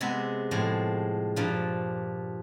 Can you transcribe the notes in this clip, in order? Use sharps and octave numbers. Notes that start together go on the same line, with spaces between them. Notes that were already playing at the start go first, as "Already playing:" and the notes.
C3 G#3 B3 E5
A2 F3 G#3
G2 A#2 F3